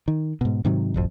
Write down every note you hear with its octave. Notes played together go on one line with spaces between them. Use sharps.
D#3
G#2 B2
G#2 C3 D#3 F#3
D1 G#1 F2